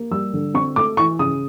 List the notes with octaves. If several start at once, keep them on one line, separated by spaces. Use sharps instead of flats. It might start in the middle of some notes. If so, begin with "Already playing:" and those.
Already playing: A#3
G3 E6
D3
C4 C#6
A3 D6
E3 C#6
C#3 D#6